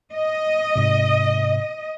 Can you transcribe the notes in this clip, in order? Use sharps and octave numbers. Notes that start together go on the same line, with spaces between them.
D#5
G#2 C3